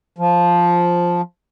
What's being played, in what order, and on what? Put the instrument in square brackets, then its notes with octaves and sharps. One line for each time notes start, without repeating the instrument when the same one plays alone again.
[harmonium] F3